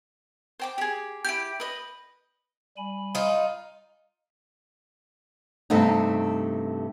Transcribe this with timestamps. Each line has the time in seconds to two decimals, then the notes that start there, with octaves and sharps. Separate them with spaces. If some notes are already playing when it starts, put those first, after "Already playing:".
0.60 C5 G5 D6
0.78 G4 G#4
1.25 E4 F4 G4 G6 D7
1.60 B4 D#5
2.77 G3 G#5 B5
3.15 D#4 F4
5.70 G2 C3 A3 B3 D#4